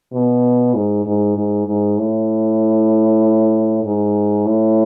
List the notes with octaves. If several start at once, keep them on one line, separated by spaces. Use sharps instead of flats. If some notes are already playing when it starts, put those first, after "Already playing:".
B2
G#2
G#2
G#2
G#2
A2
G#2
A2